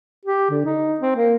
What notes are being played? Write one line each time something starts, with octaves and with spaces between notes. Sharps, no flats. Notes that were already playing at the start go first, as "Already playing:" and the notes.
G4
D3
D#4
C4
A#3